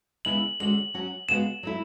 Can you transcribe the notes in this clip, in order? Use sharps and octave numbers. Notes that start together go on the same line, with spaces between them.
C#3 G#3 B3 E4 F#7
D3 G#3 C#4 F#4 F#7
F#3 C#4 F#4
C#3 G#3 B3 F#4 E7
F#3 A3 E4